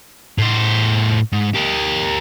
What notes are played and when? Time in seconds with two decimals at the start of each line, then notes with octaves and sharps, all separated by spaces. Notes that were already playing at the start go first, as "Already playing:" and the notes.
0.38 A2 C5
1.32 G#2
1.54 G4 A#4